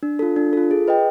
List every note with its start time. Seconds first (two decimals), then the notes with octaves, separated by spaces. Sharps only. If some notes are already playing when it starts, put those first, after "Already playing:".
0.03 D4
0.19 F4 A4
0.36 D4
0.53 F4 A4
0.71 G#4
0.88 B4 D#5 G5